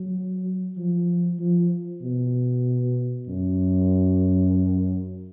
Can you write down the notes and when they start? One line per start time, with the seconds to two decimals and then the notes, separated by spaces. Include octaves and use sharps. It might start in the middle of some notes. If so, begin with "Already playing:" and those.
Already playing: F#3
0.77 F3
1.39 F3
2.02 B2
3.28 F#2